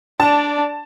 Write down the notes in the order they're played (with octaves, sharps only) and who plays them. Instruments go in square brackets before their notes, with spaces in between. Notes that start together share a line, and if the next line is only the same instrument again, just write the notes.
[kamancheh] D4 D5 [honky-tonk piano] A5